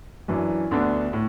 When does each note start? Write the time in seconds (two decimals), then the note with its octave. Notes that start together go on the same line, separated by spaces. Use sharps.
0.28 F#2 E3 D4
0.71 D2 D3 B3 D4
1.13 A2